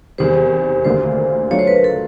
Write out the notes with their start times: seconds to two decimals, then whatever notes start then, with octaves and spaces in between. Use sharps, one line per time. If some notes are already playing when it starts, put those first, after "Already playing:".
0.18 E2 C3 D#3 G3 C5
0.84 D2 D3 G3 A#3 C5
1.51 F#3 A3 D4 F4 C#5
1.59 C5
1.67 B4
1.76 A#4
1.84 A4